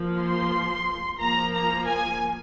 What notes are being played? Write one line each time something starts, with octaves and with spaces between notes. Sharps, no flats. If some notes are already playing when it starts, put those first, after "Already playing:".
Already playing: F3 A#3
C6
F3 A#3 A#5
A#5
G#5